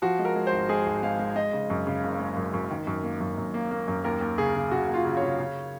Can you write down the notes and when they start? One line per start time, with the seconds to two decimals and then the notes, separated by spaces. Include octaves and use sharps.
0.02 F3 F#4
0.19 G#3
0.25 A#4
0.36 G#3
0.47 C5
0.52 G#1
0.69 G#3 G#4
0.86 G#1
1.03 G#3 F5
1.19 G#3
1.36 G#3 D#5
1.53 C#3
1.70 F#2
1.87 C#3
2.04 F#1
2.20 G#3
2.37 F#2
2.54 F#2
2.71 D#3
2.87 F#2
3.04 A#3
3.21 F#2
3.37 F#2
3.54 A#3
3.71 A#3
3.88 F#2
4.04 D#2 A#4
4.21 D#2
4.38 C#3 G#4
4.55 C#3
4.71 C#3 F#4
4.89 D#2
4.94 F4
5.05 C#3
5.17 C#5
5.22 C#3
5.38 C#3